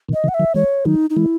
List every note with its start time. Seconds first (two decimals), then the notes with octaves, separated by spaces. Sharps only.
0.09 B2 D#3
0.13 D#5
0.24 C#3 E3
0.28 F#5
0.34 E5
0.39 D#3 F#3
0.54 E3 G#3 C#5
0.85 D#3 F#3 D#4
1.10 D#4
1.16 E3 G#3 E4